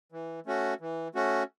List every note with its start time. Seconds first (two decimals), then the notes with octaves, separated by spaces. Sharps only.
0.12 E3
0.46 A3 C#4 F#4
0.80 E3
1.15 A3 C#4 F#4